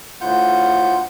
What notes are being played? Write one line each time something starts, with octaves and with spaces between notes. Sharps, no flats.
D2 A2 F4 F#5 G6